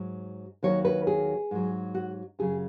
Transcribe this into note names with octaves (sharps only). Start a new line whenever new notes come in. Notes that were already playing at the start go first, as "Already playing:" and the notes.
Already playing: G#2 F#3
D#2 D#3 F#3 C#5
B4
G#4
G#2 F#3
F#4
F#2 C#3 F#3 G#4